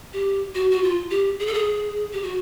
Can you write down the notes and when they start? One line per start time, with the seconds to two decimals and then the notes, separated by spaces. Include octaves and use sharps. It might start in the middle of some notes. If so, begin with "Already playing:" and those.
0.13 G4
0.55 F#4
0.71 F#4
0.83 F4
1.10 G4
1.39 G#4
1.47 A4
1.54 G#4
2.13 G4
2.23 F#4